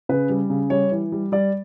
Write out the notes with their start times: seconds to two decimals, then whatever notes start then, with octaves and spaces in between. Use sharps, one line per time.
0.09 C#3 B4
0.30 G3
0.50 C#3
0.70 G3 C#5
0.92 E3
1.12 G3
1.32 G3 D5